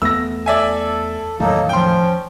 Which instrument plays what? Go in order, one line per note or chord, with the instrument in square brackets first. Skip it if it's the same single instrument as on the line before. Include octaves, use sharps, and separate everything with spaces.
[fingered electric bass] E2 A3 B3 [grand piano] E6 A#6
[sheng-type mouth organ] A4 [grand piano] D5 E5 G#5
[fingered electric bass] E2 A2 D#3 [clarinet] F#3 [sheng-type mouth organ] A#3 D#4 A4
[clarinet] F3 [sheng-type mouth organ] C#4 [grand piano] G5 C6